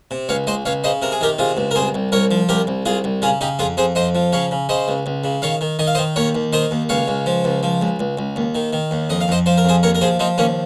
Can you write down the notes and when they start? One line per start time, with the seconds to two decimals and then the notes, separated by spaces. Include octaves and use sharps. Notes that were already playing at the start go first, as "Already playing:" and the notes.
0.11 C3
0.29 C#2 C#5 F5
0.47 C#2 C5 D#5
0.65 C#2 C#5 F5
0.84 C#3 C5 D#5
1.02 C3 A#4
1.12 G#4
1.21 D#3 G4 A#4
1.38 C3 F4 G#4
1.57 C#2
1.71 A#4
1.75 C2 G#4 C5
1.94 C2
2.12 C2 A#4 C#5
2.31 F3
2.49 C2 G4 A#4
2.67 C2
2.85 C2 F4 G#4
3.04 C2
3.22 C#3 F4 G#4
3.41 C#3 D#4 G4
3.59 F2 F4 G#4
3.77 F2 G#4 C5
3.95 F2 C5 D#5
4.15 F3
4.33 C#3 C#5 F5
4.51 C#3
4.69 C#3 C5 D#5
4.88 C#2
5.06 C#2
5.24 C#3
5.42 D#3 C#5 F5
5.61 D#3
5.79 D#3 D#5
5.87 F5
5.95 C5 D#5
5.98 D#3
6.16 D#2 A#4 C#5
6.35 D#2
6.53 D#3 C5 D#5
6.71 D#2
6.89 C#2 C#5 F5
7.08 C#2
7.26 F3
7.44 C#2
7.63 F3
7.82 C#2
7.99 C#2
8.18 C#2
8.36 D#2
8.55 D#3
8.73 D#3
8.91 D#2
9.10 F2 D#5
9.21 F5
9.28 F2 C5 D#5
9.46 F3 C5
9.57 A#4
9.65 F2 G#4 C5
9.83 D#2 A#4 C#5
9.95 A#4
10.01 F3 G#4 C5
10.19 F3 C4 D#4
10.38 D#2 A#3 C#4